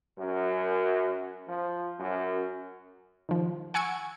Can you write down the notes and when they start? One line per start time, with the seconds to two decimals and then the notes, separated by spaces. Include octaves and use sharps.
0.18 F#2
1.48 F3
2.00 F#2
3.29 D#3 F3
3.74 F#5 G#5 C#6 E6 G#6 C#7